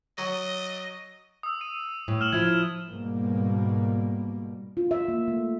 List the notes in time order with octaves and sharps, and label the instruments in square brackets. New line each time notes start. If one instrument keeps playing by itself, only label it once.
[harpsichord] F#3 [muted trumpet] D#5
[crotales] D#6 E6
D#7
[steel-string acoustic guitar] A2
[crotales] F6 E7 F#7
[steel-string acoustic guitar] F3 E4 [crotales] G#6
[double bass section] G#2 B2 G3 A#3
[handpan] F4
E5
A#3
A3